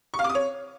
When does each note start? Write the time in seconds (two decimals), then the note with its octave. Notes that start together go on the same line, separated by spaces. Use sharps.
0.14 C#6
0.19 F5
0.24 D6
0.30 D#6
0.35 C#5